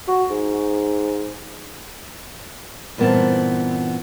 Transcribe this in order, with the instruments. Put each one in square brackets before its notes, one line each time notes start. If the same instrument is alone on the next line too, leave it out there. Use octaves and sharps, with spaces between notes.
[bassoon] F#4
G#2
[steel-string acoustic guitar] G2 A#2 E3 B3 C4 A5